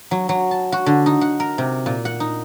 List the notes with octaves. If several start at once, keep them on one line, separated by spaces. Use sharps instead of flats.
F#3
F#3
A5
F#4
D3
D#4
F#5
A#4
C3
A#2
F#5
D#4